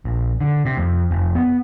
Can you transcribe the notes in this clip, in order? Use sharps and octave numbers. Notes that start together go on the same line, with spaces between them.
A#1
D3
C3
F2
F1
B3